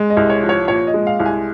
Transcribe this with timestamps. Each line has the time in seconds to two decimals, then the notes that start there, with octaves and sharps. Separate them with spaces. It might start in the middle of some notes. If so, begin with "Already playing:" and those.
Already playing: G#3
0.10 D#5
0.17 C2
0.30 C#5
0.43 F3
0.49 C#5
0.68 A#2 C#5
0.87 D#5
0.94 G#3
1.07 F5
1.20 C2
1.26 G#5